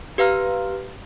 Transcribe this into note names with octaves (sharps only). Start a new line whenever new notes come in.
G4 B4 F5 A#5 F6